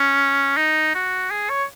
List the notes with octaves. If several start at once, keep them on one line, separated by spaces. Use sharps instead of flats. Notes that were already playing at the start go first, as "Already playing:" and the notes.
Already playing: C#4
D#4
F#4
G#4
C#5